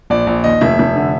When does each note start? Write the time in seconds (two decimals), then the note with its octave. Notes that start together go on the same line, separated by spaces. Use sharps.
0.10 A#1 D5
0.27 A#1
0.44 D#2 D#5
0.61 F1 E5
0.79 F1
0.96 D3